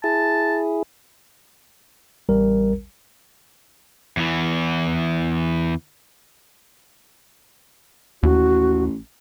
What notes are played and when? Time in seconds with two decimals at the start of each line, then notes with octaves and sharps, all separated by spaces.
0.04 E4 G#4 A5
2.29 A1 G3 A#4
4.17 E2 E3
8.23 A1 D#2 F#4